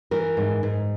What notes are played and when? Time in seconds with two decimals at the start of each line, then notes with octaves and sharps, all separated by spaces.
0.11 E3 A#4
0.37 G#2
0.63 G#2